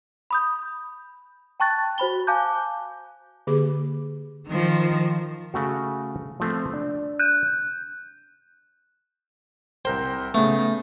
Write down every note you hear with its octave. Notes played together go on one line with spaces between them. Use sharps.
B5 D#6 G6
G5 A5 C#6 F#6 A6
F#4 C5 B5 G7
F5 G#5 A5 D6 F#6 G6
D3 A#3 G4 G#4 D6
D#3 F3
C#3 A3 F#4
F3 A3 C4
D4
F#6 G6
C2 A#4 C5 G5
C#3 A3 B3